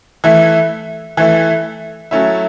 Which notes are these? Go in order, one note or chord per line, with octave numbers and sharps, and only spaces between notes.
E3 A3 E4
E3 A3 E4
F#3 A3 C#4 E4